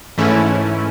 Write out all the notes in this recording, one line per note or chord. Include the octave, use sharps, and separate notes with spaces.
G#2 E3 A3 C#4 E4